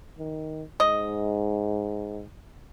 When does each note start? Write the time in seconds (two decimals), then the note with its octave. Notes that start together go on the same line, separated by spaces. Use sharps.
0.18 D#3
0.80 G#2 D#5